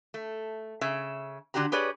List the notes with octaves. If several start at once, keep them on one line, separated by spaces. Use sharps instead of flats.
A3
C#3 E5
D3 D4 F#4 G4 A#5
G4 G#4 B4 C#5 D5